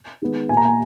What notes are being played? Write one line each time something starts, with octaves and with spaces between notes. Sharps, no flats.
D#3 G#3 B3
A#2 A#3 G#5 A#5
G#5